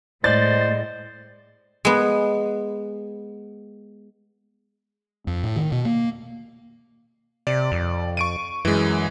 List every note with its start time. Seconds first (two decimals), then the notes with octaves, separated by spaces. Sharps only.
0.24 A2 G#3 C5 D5 D#5 A6
1.85 G#3 B3
5.27 F2
5.43 A2
5.56 D#3
5.72 B2
5.85 A#3
7.47 C3 D5
7.72 F2
8.17 C#6 D7 D#7
8.65 F#2 E3 G#3